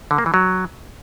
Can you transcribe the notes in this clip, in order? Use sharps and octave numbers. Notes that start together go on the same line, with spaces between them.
D3
A#3
E3
F#3